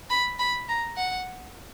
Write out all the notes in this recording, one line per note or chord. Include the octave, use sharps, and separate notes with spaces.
B5
B5
A#5
F#5